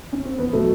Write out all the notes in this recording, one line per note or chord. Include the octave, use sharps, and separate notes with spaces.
C#4
C4
E2 B3
B2 F#3 A3